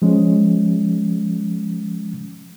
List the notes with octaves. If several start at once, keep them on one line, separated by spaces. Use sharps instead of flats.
F3 G#3 C#4